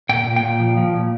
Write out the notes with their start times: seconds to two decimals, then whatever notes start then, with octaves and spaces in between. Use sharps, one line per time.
0.09 A#2 G5
0.27 A#2
0.36 G5
0.43 A#2
0.60 F3
0.77 F3
0.94 A#2